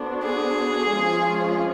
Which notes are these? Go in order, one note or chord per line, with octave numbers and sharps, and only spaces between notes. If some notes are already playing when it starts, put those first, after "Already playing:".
Already playing: B3 D4 F#4 A4 C5
G#4
F3 G#3 C#4 F4